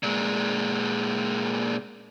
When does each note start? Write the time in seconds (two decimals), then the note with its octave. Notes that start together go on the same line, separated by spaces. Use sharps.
0.03 A#2 G#3